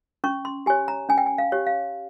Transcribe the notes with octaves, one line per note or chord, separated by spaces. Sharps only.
C#4 C#6
C6
G4 C#5 G#5
A#5
C#4 G#5
G5
G#5
F5
G4 C#5
F5